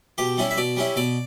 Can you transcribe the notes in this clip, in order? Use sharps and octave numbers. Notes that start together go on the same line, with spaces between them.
B2 G4
G3 C#4 E4
E5
B2 D5
G3 C#4 E4
B2 D5